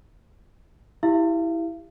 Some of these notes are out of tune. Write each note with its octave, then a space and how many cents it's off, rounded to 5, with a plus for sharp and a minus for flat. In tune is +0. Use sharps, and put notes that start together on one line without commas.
E4 -5 G4 +0 F5 -40